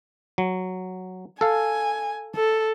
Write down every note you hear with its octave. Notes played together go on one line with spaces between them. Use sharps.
F#3
A4 F5 G#5
A4